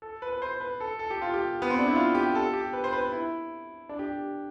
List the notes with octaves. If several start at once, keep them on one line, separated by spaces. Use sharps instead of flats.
A4
B4
B4
C5
B4
A4
A4
G4
F4
G4
B3
C4
D4
E4
F4
G4
A4
G4
B4
C5
B4
E4
D4
G4